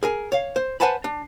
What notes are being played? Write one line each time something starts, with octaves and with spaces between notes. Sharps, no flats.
G#4 A#4 G#5
C#5 F5
C5
B4 C5 F#5 G#5 A5 B5
D4